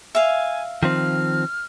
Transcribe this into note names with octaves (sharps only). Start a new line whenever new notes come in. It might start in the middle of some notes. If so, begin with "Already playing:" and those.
E5 F5 G#5
D#3 F3 C4 F6